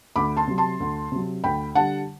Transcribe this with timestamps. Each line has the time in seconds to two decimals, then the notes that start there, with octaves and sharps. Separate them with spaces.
0.16 D2 B5 D6
0.37 A5 C6
0.47 C3 F#3
0.58 A5 C6
0.80 D2
1.12 C3 F#3
1.44 D2 G5 B5
1.75 D3 G3 F#5 A5